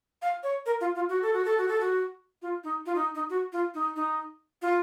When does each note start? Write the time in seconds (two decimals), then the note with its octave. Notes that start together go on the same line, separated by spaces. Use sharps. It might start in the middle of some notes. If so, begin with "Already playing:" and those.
0.22 F5
0.43 C#5
0.66 A#4
0.81 F4
0.95 F4
1.09 F#4
1.22 A4
1.33 F#4
1.45 A4
1.58 F#4
1.68 A4
1.80 F#4
2.42 F4
2.64 D#4
2.86 F4
2.95 D#4
3.15 D#4
3.30 F#4
3.53 F4
3.74 D#4
3.96 D#4
4.62 F4